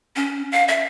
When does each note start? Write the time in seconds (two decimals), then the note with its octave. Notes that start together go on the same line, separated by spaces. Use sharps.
0.16 C#4
0.52 F5
0.68 E5